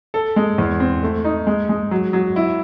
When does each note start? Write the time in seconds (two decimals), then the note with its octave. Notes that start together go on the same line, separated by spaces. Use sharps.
0.14 A4
0.36 G#3
0.58 E2
0.80 C4
1.03 A3
1.25 D#4
1.47 G#3
1.69 G#3
1.91 F#3
2.13 F#3
2.36 E4